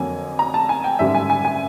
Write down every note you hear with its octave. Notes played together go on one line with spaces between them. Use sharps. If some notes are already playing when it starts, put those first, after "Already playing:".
Already playing: F2 D3 F#3 A#3 G#5
A#5
A5
G#5
G5
G#1 F#2 D3 G3 E5
G#5
G#5
G#5